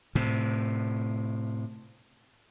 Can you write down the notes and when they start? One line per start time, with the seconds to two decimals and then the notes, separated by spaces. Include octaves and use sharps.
0.15 A2 C3